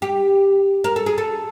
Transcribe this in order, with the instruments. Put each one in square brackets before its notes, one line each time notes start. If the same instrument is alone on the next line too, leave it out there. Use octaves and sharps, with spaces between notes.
[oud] G4
A#4
A4
G#4
A4